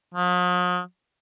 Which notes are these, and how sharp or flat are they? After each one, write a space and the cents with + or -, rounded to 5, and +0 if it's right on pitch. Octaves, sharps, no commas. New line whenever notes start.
F3 +45